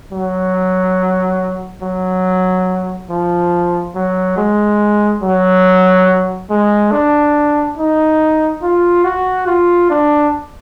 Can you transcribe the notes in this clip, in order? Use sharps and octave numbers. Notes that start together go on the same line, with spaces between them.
F#3
F#3
F3
F#3
G#3
F#3
G#3
D4
D#4
F4
F#4
F4
D4